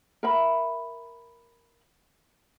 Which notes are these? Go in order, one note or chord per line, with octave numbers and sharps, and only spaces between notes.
A#4 E5 B5